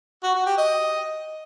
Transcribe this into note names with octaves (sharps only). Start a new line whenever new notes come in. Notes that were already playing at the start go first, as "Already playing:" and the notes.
F#4
F#4
G4
D#5